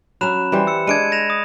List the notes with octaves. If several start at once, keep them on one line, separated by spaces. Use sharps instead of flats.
F#3 C#4 B5 F#6 E7
E3 G3 C5
E6 C#7
G#3 D4 G#6 D7 D#7
A#6 E7 F7
D#6